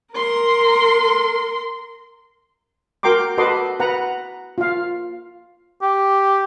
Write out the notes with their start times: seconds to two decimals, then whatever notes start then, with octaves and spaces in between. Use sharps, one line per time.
0.14 A#4 C6
3.03 F#4 A#4 G5 A#5 C6 D6
3.38 F#4 A4 B4 D#5 C6 D6
3.80 B4 F#5 A#5
4.58 F4 F5
5.82 G4